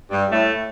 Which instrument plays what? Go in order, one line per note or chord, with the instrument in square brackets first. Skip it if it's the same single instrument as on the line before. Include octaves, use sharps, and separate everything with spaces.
[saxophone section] G2 G3
A2 A3